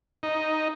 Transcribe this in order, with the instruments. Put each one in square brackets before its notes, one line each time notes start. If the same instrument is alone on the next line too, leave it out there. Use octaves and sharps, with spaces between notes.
[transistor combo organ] D#4